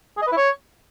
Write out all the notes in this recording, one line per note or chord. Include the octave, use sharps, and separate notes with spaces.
G#4
D#5
B4
E4
C#5